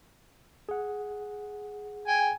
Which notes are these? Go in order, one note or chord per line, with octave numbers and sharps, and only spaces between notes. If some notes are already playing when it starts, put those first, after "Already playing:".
G#4 F#5
G5 G#5